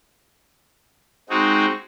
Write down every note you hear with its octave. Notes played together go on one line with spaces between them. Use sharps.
G#3 C4 D#4 F#4